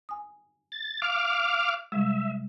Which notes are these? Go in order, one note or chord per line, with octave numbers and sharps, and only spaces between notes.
G#5 D#6
A6
F5 D6 F6
C3 G3 G#3 E5